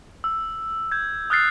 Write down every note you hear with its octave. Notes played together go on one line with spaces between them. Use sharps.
E6
G6 G#6
D#6 F6 F#6 A6 C7